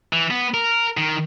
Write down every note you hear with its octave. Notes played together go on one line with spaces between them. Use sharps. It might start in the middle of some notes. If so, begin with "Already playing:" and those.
E3
B3
A#4
D#3